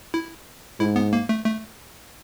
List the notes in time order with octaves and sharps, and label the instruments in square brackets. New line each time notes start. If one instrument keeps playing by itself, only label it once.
[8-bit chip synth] E4
[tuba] G#2 [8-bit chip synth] E4
[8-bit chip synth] B3
A#3
A3
A3